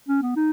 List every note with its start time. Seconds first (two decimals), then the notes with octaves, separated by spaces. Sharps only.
0.09 C#4
0.22 B3
0.36 D#4